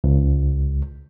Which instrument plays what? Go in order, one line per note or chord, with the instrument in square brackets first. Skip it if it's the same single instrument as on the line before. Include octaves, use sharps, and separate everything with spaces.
[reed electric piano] C#2